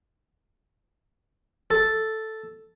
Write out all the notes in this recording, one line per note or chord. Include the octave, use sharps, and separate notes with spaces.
A4